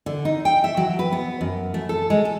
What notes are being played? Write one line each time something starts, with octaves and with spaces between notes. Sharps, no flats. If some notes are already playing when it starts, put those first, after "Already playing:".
D3
D#4
G5
E5
F#3
B4
B3
F#2
A3
A4
G#3
A4